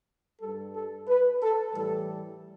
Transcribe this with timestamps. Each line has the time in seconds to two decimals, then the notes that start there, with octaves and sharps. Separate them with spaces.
0.41 G2 G3 A4
0.74 A4
1.08 B4
1.42 A4
1.75 A2 E3 G3 A4